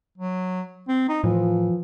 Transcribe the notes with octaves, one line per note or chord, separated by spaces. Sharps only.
F#3
C4
D#4
A2 E3 F3